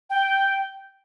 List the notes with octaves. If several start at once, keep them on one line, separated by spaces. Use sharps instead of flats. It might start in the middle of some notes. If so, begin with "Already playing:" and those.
G5